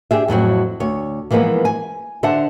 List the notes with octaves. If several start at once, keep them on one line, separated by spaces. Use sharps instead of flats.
D4 G4 G#4 E5
F2 A2 F#3 C4
D2 C#5
E3 F3 G#3 A#3 B3
G#5
D3 C5 E5 F#5 A5